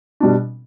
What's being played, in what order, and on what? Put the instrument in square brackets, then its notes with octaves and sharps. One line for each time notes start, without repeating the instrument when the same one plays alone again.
[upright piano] B2 G3 D4